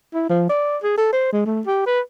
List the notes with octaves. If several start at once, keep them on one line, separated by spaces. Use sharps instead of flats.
E4
F3
D5
G#4
A4
C5
G#3
A3
G4
B4